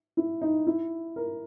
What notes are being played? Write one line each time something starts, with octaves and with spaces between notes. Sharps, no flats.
E4
D#4
E4
A#4